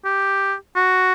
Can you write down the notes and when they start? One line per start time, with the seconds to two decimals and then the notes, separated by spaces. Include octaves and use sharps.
0.05 G4
0.75 F#4